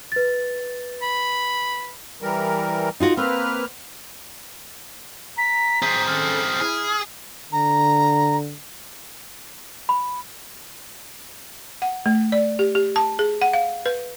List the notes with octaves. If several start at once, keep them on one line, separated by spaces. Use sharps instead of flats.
B4 A6
B5
E3 G3 A#4
D#4 F4 F#4
A#3 C4 B4 F6
A#5 B6
C4 G#4 B6
D#3 C#4 A4 F6
E4 G#4
D3 A#5
B5
F#5
A3
D5
G4
G4
A5
G#4
F#5
F5
B4